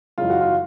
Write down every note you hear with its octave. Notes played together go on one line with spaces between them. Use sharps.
F#2 C#3 E3 G#3 F4
F#4
F4